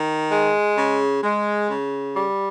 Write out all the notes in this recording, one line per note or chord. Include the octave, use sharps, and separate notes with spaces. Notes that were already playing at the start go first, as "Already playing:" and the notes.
Already playing: D#3
G#3
C#3
G#3
C#3
G3